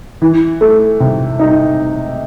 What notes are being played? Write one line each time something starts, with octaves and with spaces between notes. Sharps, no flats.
E3
A3
C3
D#4